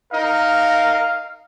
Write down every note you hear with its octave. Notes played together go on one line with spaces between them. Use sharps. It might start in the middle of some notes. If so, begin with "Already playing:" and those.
D#4 A#4 F5